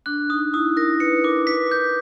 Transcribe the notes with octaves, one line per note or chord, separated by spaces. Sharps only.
D4 F#6
D#4 D#6
E4 D#6
A#4 A#6
B4 C#7
A#4 D6
B4 B6
G6